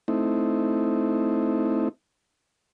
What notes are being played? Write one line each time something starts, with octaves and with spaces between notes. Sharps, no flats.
A3 C4 D#4 E4